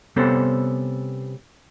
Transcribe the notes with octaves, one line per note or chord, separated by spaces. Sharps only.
C3 G3 B3 C#4 A4 C5